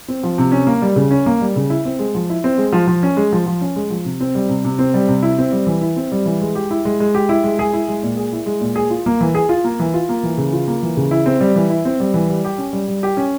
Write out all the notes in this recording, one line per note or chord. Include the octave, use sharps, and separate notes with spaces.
C4
F3
C3
C#4
A#3
G3
C#3
C#4
A#3
G3
C#3
E4
C4
G#3
F3
E4
C4
G#3
F3
F3
C#4
G#3
F3
F3
C#4
G#3
F3
C3
C4
G3
C3
C3
C4
G3
C3
E4
C4
G3
E3
E4
C4
G3
E3
G#3
G4
E4
G#3
G#3
G4
E4
G#3
G#4
E4
G#3
A#2
G#4
E4
G#3
A#2
G#4
F4
A#3
E3
G#4
F4
A#3
E3
F4
A#3
E3
C#3
F4
A#3
E3
C#3
E4
C4
G3
E3
E4
C4
G3
E3
G3
G4
C#4
G3
G3
G4
C#4